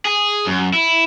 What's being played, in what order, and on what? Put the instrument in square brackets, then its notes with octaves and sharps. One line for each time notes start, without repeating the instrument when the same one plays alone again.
[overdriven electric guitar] G#4
F#2
E4